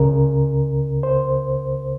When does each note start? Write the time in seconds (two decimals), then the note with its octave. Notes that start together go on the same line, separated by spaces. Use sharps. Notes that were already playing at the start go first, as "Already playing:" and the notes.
Already playing: C#2 C#3 A#4
1.03 C5